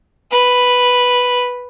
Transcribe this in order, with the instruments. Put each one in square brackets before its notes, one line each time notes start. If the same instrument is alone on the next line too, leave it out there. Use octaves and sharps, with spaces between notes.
[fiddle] B4